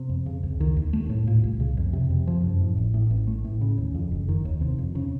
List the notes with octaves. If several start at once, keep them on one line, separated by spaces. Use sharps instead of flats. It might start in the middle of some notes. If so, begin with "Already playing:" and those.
Already playing: C3
F2
C#3
C#2
D#3
D#2
A3
A2
A#2
C2
C#3
F2
C3
F2
F3
F#2
A2
A1
A2
A1
A3
A2
C#3
D#2
F2
F#1
D#3
D#2
C3
F2
C#3